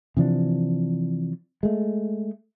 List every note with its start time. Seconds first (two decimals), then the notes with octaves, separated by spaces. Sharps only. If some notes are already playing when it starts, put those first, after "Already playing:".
0.17 C3 E3 F3 D4
1.63 G#3 A3